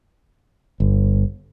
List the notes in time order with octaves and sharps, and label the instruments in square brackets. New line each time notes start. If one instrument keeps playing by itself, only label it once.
[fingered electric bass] G1